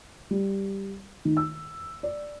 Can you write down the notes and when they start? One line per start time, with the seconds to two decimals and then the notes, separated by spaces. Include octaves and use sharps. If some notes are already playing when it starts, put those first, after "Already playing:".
0.31 G3
1.25 D#3
1.37 E6
2.03 D5